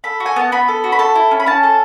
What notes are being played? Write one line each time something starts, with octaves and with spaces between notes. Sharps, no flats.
A4 B5
F#4
G#5
B3 A5
B3 B5
A4
F#4
B5
A4 A5
E4
C#4
B5
C#4 A5
A4